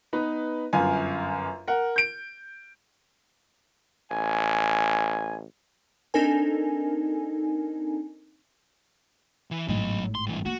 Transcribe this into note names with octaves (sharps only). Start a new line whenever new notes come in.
B3 D#4 B4
G1 F#2 F5 G#5
A#4 F#5
G6 D7
A1 G#5
C4 D4 D#4 A4 A#4 G#5
E3 E4
G#1 A2 F#3 D#5
C6
G2 E3
A#3 F#4